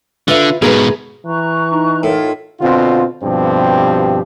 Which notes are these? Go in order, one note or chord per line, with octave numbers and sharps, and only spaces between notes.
D3 F4 B4 E5
G#2 B2 G#4 A#4 B4
E3 A#5 C#6 F#6
D#4
A2 F4 A#4 C#5
B2 D3 C4 F4
D2 G2 B2 F3 C4 G4